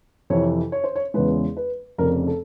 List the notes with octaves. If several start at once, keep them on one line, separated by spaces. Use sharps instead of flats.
F2 C3 E3 C#5
C#5
C5
C#5
E2 C#3 E3 G#3 B4
B4
F1 F2 C#3 A#4
A4